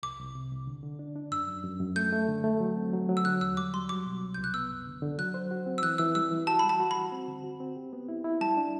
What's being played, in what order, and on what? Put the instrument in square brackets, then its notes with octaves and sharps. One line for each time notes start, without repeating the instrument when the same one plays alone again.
[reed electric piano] C2 [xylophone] D6
[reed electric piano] C2
C3
C2
D3
D3
D4
D4
[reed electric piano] F#2 [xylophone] E6
[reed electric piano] F#2
F#2
F#2
[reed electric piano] A3 [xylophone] G6
[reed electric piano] A3
D3
A3
F#3
C4
F#3
F#3
[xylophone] E6
[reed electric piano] D3 [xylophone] F#6
[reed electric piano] E2 [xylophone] E6
[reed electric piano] G3 [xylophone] D6
[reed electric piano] G3 [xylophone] C6
[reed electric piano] F#3 [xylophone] D6
[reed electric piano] B2
C2
[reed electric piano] C2 [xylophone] G6
[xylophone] F#6
[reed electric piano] B3 [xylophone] E6
[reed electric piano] F#2
D3
D3
[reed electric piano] F#3 [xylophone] F#6
[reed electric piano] C5
F#4
C4
[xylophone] E6
[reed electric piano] E3 [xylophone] F#6
[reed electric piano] E3 [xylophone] E6
[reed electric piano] G3 [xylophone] E6
[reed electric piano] E3
[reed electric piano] F#4 [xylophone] A5
[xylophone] B5
[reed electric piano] G3
[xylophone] A5
[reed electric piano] F#4
[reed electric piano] F#4 [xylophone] B5
[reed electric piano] C4
D3
F#4
C4
G4
B3
E4
E4
[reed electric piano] G3 [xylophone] A5
[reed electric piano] D4